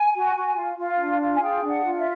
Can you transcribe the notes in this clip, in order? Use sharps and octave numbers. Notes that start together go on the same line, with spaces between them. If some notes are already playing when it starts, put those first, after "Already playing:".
Already playing: G#5
F#4
F#4
F4
F4
D4
F4
G#5
G#4 G5
D4
F#5
F4
E5